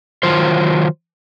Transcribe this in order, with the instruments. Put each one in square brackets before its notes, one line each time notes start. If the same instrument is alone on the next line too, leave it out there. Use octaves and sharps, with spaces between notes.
[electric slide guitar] D#3 F#3 F4 C5